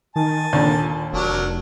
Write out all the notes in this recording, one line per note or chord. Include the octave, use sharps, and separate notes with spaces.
D#3 G#5 A5
D#2 A#2 D3
F1 F#3 D4 A#4